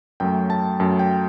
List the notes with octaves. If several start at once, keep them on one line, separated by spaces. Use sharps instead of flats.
F#2 F#3 A3 G5
A5
F#2 F#3 A3 A5
G5